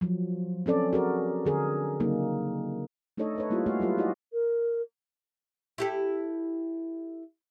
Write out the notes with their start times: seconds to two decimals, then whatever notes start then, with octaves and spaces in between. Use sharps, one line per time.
0.01 F3 F#3
0.66 C4 C#4 A4 D5
0.93 F#4 G#4 A#4
1.45 D3 G#4 A#4
2.00 C#3 F#3 A#3 D#4
3.17 A3 D4 D#4 A4 C#5 D#5
3.36 A4 B4 C#5
3.50 G3 A#3 E4 F4 G4
3.66 A3 A#3 F#4 G#4 C#5 F5
3.80 F#3 G3 F4 B4
3.97 D#4 E4 F#4 G#4 D5 D#5
4.33 A#4
5.78 E4 G4 A4